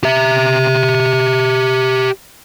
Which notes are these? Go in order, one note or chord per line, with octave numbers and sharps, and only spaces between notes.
G4 E5